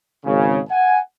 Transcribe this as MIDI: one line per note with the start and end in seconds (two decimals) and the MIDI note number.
0.24 0.60 32
0.24 0.60 49
0.70 0.98 78
0.70 0.98 80